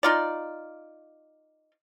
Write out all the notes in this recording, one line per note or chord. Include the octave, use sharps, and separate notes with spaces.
D#4 F4 D5